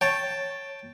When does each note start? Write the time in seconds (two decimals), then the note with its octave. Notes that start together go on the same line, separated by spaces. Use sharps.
0.01 C#5 G5 A5